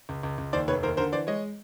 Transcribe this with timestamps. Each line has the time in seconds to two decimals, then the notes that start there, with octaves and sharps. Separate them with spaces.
0.09 C#2
0.23 C#2
0.38 C#2
0.53 D#2 C5 D5
0.68 F1 B4 C#5
0.83 D#2 A#4 C5
0.97 D3 A#4 C5
1.12 E3 C5 D5
1.27 G#3 C#5 D#5